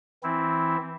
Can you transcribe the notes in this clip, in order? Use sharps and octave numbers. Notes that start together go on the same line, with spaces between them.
E3 C4 E4